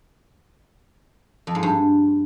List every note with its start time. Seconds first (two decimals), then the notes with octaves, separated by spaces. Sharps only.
1.47 F2
1.55 G#2
1.63 G2